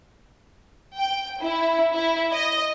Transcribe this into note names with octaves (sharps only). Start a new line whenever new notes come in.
G5
E4
E4
D#5